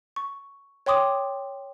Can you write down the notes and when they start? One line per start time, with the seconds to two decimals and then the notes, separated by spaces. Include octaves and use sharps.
0.16 C#6
0.86 C#5 G5 C6 D6 D#6